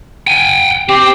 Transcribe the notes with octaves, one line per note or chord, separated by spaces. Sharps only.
G5 G#5
C4 G4